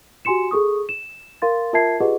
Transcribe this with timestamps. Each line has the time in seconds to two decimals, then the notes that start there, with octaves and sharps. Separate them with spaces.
0.25 F#4 G4 G#5 C6 C#7 E7
0.51 G#4 A4 C#6 D#6
0.89 E7
1.42 A#4 F5 C6 A6
1.73 F4 A#4 E5 A5 G#6 C7
2.00 F4 G4 G#4 B4 D#5 F#5